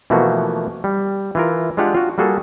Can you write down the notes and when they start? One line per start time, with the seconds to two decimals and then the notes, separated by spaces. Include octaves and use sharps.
0.10 B2 E3 F3 A3 A#3 F#4
0.84 G3
1.35 E3 F4 A#4
1.77 G#3 D4 F4 G4 F5 F#5
1.95 F4 F#4
2.18 G3 A#3 F#4 G#4 A4